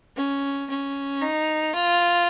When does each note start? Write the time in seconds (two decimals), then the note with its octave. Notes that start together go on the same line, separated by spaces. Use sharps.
0.17 C#4
0.70 C#4
1.21 D#4
1.74 F4